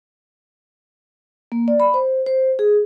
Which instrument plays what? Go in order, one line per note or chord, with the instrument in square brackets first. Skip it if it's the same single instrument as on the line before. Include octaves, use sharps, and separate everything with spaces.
[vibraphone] A#3
D5
B5
C5
C5
G#4